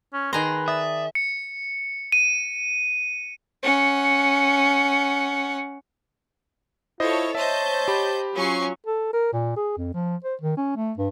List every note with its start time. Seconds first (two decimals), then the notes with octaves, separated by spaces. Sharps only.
0.13 C#4
0.33 D#3 G#4 B4 A#5 C6
0.68 D5 E5 D#6
1.15 C#7
2.12 D#7
3.62 C#4 F#5
7.00 E4 F4 A4 C5 C#5 D#5
7.35 C5 C#5 D#5 E5 A5 G6
7.88 G4 B5
8.35 F#3 C#4 F4 C#6 C7
8.86 A4
9.13 A#4
9.33 A#2
9.56 G#4
9.77 F2
9.94 F3
10.24 C5
10.42 D#3
10.57 C#4
10.76 A3
10.98 G2